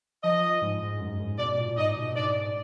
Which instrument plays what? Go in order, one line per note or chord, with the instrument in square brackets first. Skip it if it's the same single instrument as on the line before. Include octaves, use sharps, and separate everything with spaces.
[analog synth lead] F3 [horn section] D#5
[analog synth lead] G#2
G#2
F#2
G#2
[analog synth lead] B2 [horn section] D5
[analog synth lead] A#2
[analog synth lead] G#2 [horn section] D#5
[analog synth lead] B2
[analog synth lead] G#2 [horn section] D5